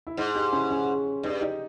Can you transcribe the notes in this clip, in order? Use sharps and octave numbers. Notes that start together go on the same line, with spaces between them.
E4
G#2 D#4
D#4 G4
C#4 E4
C#4
G2 D#4
D#4 G4